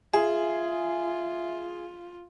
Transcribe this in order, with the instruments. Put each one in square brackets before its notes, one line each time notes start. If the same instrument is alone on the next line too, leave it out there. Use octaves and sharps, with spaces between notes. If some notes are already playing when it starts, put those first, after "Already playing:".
[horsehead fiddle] F4 [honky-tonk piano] G#4 [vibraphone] E5